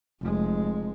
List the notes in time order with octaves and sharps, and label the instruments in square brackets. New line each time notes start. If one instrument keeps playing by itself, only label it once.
[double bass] F1 G#3